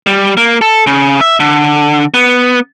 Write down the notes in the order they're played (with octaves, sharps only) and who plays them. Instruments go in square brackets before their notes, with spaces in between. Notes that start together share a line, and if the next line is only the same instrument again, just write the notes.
[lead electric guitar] G3
A#3
A4
C#3
E5
D3
B3